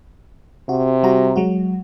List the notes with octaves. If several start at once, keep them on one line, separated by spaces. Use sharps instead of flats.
C3 F#4
G3 F#4 A#5
F#3 G#3 F#4